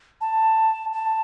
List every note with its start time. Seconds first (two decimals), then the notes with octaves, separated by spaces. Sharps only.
0.21 A5
0.93 A5